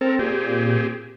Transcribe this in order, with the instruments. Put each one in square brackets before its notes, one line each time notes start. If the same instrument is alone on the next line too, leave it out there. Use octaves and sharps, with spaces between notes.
[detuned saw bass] C4 [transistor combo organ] A4 A#4
[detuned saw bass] A#2 [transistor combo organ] C4 G4 G#4